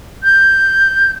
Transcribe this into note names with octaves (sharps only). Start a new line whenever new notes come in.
G6